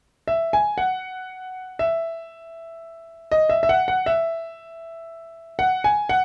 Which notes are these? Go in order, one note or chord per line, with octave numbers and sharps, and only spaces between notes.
E5
G#5
F#5
E5
D#5
E5
E5
F#5
F#5
E5
F#5
G#5
F#5